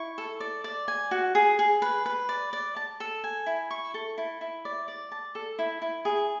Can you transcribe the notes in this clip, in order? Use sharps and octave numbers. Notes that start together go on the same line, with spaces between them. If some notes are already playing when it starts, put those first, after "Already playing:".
Already playing: E4 C#6
A4
D5
D5
G#5
F#4
G#4
G#4
B4
B4
D5
D5
A5
A4
G#5
E4
C#6
A4
E4
E4
D5
D5
A5
A4
E4
E4
G#4